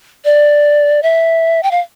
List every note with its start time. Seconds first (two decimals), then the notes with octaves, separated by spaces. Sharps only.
0.25 D5
1.03 E5
1.63 G5
1.71 F5